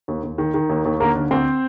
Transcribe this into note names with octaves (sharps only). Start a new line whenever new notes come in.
D#2
D#2
D#3
D#3
D#2
D#2
D3 A#3 A#4
D3
D2 C4 C5